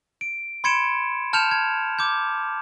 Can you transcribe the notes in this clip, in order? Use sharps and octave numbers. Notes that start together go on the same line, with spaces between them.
D7
B5 C6 G#6 C#7 D7 E7
A5 F6 G6 C#7 E7 F7
G#6
D6 G6